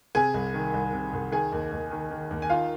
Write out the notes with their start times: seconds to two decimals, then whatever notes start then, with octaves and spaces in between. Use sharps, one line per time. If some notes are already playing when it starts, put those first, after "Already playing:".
0.15 C3 G#4 G#5
0.34 C2
0.54 D#3
0.74 C2
0.93 C3
1.13 C2
1.32 D#3 G#4 G#5
1.52 D#2
1.72 D#2
1.91 D#3
2.11 D#3
2.31 D#2
2.42 G#5
2.50 D#3 F4 F5